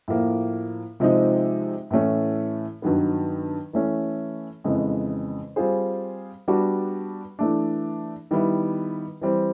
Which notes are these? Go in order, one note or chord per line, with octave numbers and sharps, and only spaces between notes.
A2 F3 A#3
C3 F3 G#3 C4 D#4
A2 E3 A3 C#4
G2 D#3 F#3 B3
E3 A3 C#4
F2 C#3 E3 G#3 B3
G3 C4 F4 G#4 C5
G3 B3 D4 F#4
E3 A3 D4
D#3 G3 B3 E4
E3 G3 C4